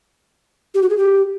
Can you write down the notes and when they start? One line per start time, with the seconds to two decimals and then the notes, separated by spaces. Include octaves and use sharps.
0.75 G4
0.82 F#4
0.90 G#4
0.97 G4